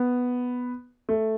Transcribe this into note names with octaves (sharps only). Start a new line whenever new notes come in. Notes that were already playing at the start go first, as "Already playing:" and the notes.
Already playing: B3
A3